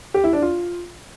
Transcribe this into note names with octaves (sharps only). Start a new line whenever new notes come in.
G4
E4
D4
F4